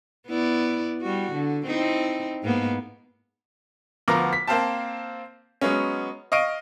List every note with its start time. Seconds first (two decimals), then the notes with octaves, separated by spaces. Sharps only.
0.27 B3 E4 D5
1.01 G3 F#4
1.32 D3
1.67 C4 D#4 E4
2.43 G#2 A#3 B3
4.08 D2 F3 B3 A#4 A#5 D6
4.33 B6
4.47 A#3 C4 C5 F5 G5 A5
5.61 F#3 G#3 B3 C#4
6.32 D#5 F5 C#6 D7 D#7